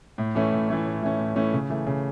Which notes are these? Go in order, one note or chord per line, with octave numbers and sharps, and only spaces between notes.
A2
E3 A3 C#4
A2
E3 A3 C#4
A2
E3 A3 C#4
A2
E3 A3 C#4
C#3
E3 A3
C#3